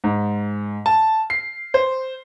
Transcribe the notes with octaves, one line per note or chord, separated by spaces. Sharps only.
G#2
A5
C7
C5